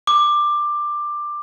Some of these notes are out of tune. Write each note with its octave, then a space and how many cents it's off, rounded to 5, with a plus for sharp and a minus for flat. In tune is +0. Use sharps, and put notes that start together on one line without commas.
D6 +15